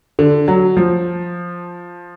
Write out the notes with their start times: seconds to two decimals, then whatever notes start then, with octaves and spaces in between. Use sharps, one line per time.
0.19 D3
0.48 F#3
0.77 F3